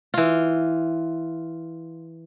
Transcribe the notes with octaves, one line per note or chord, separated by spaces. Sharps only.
E3 F4